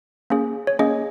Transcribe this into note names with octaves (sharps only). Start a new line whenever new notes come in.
A#3 C#4 G#4
C#5
A#3 C#4 G#4 D#5